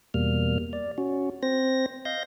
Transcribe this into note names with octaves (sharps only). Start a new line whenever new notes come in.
E2 B2 G3 A#3 F6
D5
C#4 F#4
C4 C5 A#6
D#5 F5 G6 A#6